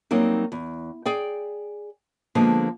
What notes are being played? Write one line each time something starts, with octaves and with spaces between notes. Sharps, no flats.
F#3 G3 A#3 C4 D#4
E2
G#4 D5 G5
D3 F3 G#3 A#3 B3